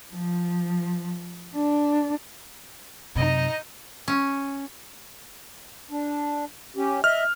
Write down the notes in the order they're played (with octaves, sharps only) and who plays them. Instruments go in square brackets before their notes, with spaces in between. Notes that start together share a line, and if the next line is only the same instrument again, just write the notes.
[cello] F3
D4
[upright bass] F#2 C3 [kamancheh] D#4 D#5
[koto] C#4
[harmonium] D4
C#4 G4
[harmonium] D#5 E5 [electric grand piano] F6